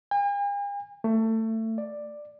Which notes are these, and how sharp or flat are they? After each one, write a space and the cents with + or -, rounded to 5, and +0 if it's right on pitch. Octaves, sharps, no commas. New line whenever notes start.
G#5 -45
A3 +25
D5 +10